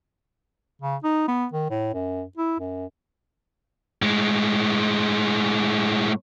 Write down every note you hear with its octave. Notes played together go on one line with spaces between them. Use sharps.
C#3
D#4
B3
D#3
A2
F#2
E4
F#2
A2 G#3